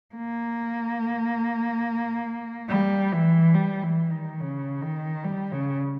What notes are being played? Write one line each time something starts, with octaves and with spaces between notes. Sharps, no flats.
A#3
G3
E3
G3
E3
D#3
C#3
D#3
G3
C#3